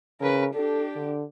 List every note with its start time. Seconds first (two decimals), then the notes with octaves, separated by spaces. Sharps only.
0.20 C#3 A#4 B4
0.55 D4 G4 A4
0.96 D3